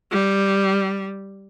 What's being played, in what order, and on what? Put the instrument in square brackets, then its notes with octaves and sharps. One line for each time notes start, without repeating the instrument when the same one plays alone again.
[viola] G3